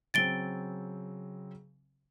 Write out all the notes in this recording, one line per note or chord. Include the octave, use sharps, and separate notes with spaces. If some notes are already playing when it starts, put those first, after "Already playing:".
C#3 F#3 C4 A6 D7 G7